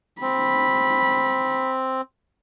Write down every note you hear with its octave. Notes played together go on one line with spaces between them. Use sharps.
C4 B5